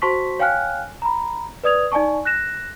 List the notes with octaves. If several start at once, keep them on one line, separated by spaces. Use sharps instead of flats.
F#4 C5 A5 C6 C#6 B6
C#5 F5 G5 G#5 F6 F#6
A#5 B5
B4 D5 D#6 G#6 F7
D#4 D5 G#5 A5 C#6
F#6 A#6 E7